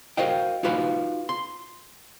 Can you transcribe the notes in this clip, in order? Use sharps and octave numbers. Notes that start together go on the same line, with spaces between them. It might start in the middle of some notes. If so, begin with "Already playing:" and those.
F#4 A#4 C5 D#5 F5 G5
D#4 F4 F#4 B4 F5
C6